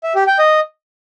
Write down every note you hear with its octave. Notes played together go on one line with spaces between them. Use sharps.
E5
G4
G5
D#5